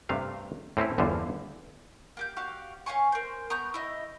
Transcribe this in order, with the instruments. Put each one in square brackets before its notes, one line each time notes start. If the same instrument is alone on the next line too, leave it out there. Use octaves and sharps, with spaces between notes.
[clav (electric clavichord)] G2 C3 A3 F5
A2 C4 C#4 E4
G1 E2 D3 F4 C5
[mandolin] A#3 G4 G6
F#4 G4 D5 F5
C#4 F5 G#5 C#6
A#4 C5
B3 A#5 C#6 G6
E4 D#5